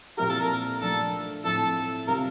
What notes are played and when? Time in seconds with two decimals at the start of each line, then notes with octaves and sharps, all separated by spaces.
0.17 A#2 F3 C4 E4 G4 A#4
0.29 A4
0.40 A#4
0.80 F3 A3 D4 A4
1.44 A2 F3 C4 E4 A4
2.08 C3 G3 C4 F4 A#4